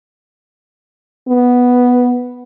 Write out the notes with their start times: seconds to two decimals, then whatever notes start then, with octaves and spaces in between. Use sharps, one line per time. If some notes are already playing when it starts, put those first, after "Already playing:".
1.28 B3